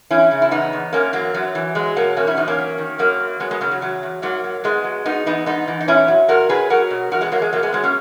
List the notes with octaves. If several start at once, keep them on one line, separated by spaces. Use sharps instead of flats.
E3 C#4 E4
C#3
E4
E2 B3 D#4
E2
F#2 A#3 C#4
E3 F#3 A#3
F#2 F#3
E3
F#3 G#3
B2 F#3 A#3
E2 A#3 C#4
C#4 E4
E2 B3 D#4
A#3 C#4
F#3
D#3
F#2 F#3 A#3
F#2
F#3 G#3 B3
G#3 B3
C#3 F#3 A#3
F#3
E2 F#3
E2
G#2 F#3 A#3
F#3
G#2 G#3 B3
F#3
G#2 B3 D#4
E3 B3 D#4
G#2 B3 D#4
E3
D#4
A#2 C#4 E4
F#3
A#2 F#4 A#4
F#3 G#4 B4
F#3 F#4 A#4
B2
E2 F#4 A#4
G#3 B3
E2 F#3 A#3
G#3
A#2 F#3 A#3
G#3 B3
F#3 G#3 B3
A#3 C#4